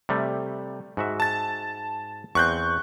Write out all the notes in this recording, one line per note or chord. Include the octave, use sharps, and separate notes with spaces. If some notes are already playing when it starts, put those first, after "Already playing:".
C3 G3 A3
G#2 F#4 E5
A5 A6
E2 C4 C#6 F#6 G6